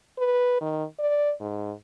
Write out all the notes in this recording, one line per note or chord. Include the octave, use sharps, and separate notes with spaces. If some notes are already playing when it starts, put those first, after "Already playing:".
B4
D#3
D5
G#2